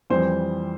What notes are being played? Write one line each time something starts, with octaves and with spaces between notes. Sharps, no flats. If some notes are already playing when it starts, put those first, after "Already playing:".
F2 E3 G3 C5